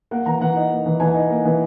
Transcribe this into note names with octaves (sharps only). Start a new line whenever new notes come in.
A#3 F#5
E3 A#5
E3 F#5
D#4
A#3
E3
E3 G#5
D#4
A#3
E3